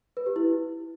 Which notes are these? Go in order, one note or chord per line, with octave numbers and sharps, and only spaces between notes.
B4
G4
E4